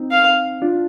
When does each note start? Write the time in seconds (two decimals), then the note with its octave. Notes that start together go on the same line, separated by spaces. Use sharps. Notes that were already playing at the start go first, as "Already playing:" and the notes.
Already playing: C4 D#4
0.11 F5
0.62 D4 F4